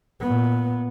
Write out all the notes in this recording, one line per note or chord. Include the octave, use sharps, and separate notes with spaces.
A#2 B3